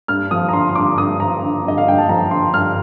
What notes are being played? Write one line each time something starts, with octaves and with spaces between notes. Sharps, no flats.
G2 F6
F3 D#6
A#5
D3 C6
C6
G2 D6
G2 D#6
F3 A#5
D3
G2 D#5
F5
G2 G5
A5
F3 A#5
D3 C6
G2 F6